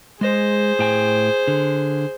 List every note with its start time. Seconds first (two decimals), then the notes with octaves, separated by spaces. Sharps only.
0.21 G#3 G#4 C5 D#5
0.79 A2 G5 G#5
1.48 D3